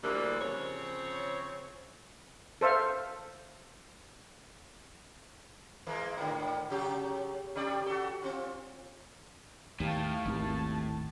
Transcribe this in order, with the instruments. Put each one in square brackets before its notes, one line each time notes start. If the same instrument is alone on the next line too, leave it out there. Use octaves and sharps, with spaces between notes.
[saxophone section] D2 D3 E3 G3 G#3 A#3
C#3 F3 C4 C#5
[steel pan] A4 C5 E5 F5
[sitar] E3 G#3 A#3
G#2 D3
C#3 F#3 G4
C3 G4 D5
F#4 A4
C4 F4
[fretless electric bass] D#2 [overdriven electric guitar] A2 [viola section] F5 G5 A5
[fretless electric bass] G#1 D#2 [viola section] A5